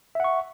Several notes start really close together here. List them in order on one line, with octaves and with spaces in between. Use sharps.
E5 F#5 C#6